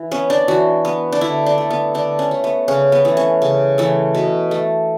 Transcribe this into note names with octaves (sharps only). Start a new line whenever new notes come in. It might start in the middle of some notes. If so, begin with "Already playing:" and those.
Already playing: E3
B3 C#4
D4
E3 F#4
B3
D4
D3 E4
D4
A3
B3
D3 D4
C#4
A3
B3
C#3 C#4
B3
E3 A3
C#4
C#3
E3 A3
B2
A3